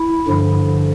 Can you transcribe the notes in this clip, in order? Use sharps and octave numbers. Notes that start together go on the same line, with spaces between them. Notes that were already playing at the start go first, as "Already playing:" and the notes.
Already playing: E4
G2 D3 F3